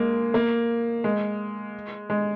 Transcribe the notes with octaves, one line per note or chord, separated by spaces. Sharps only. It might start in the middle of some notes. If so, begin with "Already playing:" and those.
Already playing: G#3 A#3
A#3
G#3
G#3